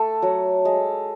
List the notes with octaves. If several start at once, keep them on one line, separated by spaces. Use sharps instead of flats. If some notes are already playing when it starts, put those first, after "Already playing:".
Already playing: A3 A4
F#3
G#3